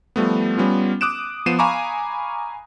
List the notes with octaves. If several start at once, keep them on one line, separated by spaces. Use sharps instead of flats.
F3 G3 A3 B3
G3 B3 C#4 F4
D6 D#6 F#6 D7 E7
F3 B3 C7 D#7 E7
F5 G#5 A#5 B5 C#6 D6